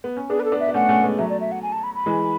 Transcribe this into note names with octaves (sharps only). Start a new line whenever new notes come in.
B3
C#4
B3 D4 G#4
B4
A4
B3 D4
E5
B3
A3 C#4 F#5
A3 C#4
G#3 B3
F#3 A3 E5
D5
E5
F#5
G#5
A5
B5
B5
E3 G#3